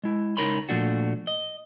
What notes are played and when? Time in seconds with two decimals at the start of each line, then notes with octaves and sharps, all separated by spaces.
0.03 G#3 E4
0.37 C#2 D#4 A#4 C#5 B5 C6
0.69 A#2 F3 A3 D4 F#4
1.27 D#5